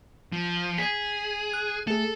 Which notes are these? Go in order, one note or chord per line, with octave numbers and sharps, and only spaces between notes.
F3
G#4 G#6 B6
F#6
A3 G#4 A4